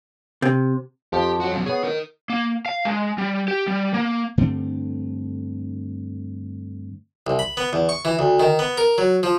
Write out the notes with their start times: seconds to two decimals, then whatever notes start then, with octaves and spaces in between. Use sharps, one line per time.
0.42 C3
1.13 F2 F3 G4
1.40 F#4 C#5
1.52 F#2 B2
1.66 B3 G#4 C#5
1.84 A#4 D#5
2.30 A#3
2.66 F5
2.85 G#3
3.18 G3
3.48 G4
3.67 G3
3.94 A#3
4.38 G2 D3 A3 C4
7.27 C2
7.39 B5
7.57 B3
7.73 E2
7.89 C#6
8.05 E3
8.19 D2
8.40 D#3
8.59 B3
8.78 A#4
8.98 F#3
9.23 F3